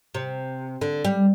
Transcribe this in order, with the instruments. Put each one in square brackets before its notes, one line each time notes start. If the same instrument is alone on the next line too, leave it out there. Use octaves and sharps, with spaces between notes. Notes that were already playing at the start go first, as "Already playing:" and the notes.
[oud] C3
D3
G3